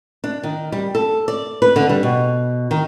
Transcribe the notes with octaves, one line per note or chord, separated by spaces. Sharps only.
D4
D#3
G3
A4
D5
B4
D3
G3
B2
D#3